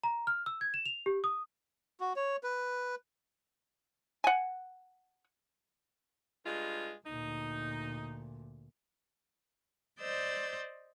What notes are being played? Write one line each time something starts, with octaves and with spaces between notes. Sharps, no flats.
A#5
F6
E6
G#6
E7
F7
G4
D#6
F#4
C#5
B4
F#5 G#5
G2 G#3 F4
D2 A#2 D#4
C5 D5 D#5 E6 G6